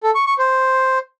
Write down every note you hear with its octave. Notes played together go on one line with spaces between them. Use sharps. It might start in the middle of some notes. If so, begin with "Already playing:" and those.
A4
C#6
C#6
C5